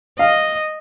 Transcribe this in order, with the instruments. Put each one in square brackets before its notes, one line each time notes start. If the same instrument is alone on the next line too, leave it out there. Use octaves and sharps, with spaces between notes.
[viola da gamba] D#5 [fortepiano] F5